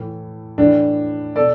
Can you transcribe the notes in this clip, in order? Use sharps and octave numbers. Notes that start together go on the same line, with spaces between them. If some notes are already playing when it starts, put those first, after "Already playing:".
Already playing: A2 E3
A2 E3 D4
B2 A4 D5